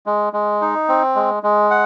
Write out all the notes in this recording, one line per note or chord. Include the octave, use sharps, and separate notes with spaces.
G#3
G#3
D#4
C4
G#3
G#3
F#5